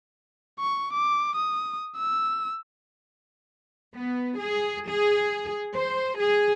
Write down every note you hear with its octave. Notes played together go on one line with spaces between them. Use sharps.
C#6
D6
D#6
E6
B3
G#4
G#4
C5
G#4